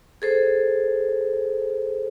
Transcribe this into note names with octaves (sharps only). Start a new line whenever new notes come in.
G#4 A4 C5